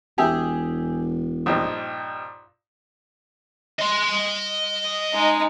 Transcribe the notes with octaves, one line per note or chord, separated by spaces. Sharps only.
E1 G4 G#4 E5
A#1 G2 D#4
D#5 C6
G#3 D#4